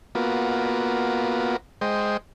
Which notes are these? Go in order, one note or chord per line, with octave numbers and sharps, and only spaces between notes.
A#3 B3 F4 F#4
G#3 C5 D#5 G5